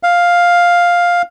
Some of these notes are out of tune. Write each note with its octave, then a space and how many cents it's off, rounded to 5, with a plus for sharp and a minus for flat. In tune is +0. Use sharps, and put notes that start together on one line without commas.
F5 +5